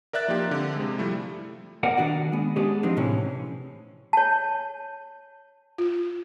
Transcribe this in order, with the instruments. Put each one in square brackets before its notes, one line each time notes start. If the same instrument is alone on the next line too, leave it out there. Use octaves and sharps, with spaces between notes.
[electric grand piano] A#4 D5 E5 F#6 A6
F3 A#3 D#4 F4 G4
D3 C4
C3 G#3
F3 G3 A3 E4
[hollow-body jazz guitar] B3 A#4 D5 F#5
D#3 D4 F#4 D5
G#3 B3
G#3 B3 C#4 D4 G4 G#4
F3 G3 C4 D4 D#4
A2 C3 E3 C#4
[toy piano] C#5 A5
[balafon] F4